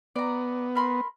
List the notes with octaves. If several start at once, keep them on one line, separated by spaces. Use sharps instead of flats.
B3 D5 A#5
A#4 B5 C6